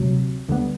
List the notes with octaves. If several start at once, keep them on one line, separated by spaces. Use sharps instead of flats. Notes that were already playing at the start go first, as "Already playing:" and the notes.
Already playing: D2 C3 F#3
D2 D3 G3 B3